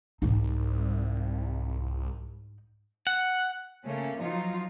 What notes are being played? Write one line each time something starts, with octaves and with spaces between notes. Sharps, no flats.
C2 G#2 D#4
F#5
C#3 A3 A#3 C#4
F3 F#3 D#4 F4